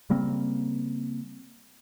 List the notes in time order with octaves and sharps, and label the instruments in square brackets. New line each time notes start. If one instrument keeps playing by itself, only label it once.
[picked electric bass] C#3 G3 A#3 C4